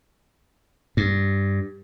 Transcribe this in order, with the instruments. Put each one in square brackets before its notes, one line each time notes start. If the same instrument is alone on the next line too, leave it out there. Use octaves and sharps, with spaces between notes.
[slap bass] G2